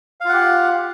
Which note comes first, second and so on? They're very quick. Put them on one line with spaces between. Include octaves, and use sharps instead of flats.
F5 F4 F#5 G4